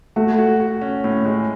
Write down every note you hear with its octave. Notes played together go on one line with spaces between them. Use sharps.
A3 F#4
F#4
F#4
C#4
A2
G#3